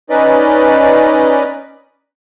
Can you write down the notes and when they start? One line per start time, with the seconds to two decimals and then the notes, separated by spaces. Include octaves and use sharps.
0.10 C#4 D#4 B4 D5 D#5